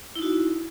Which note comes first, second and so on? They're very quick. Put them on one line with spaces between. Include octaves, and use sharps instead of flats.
E4 D#4 F#4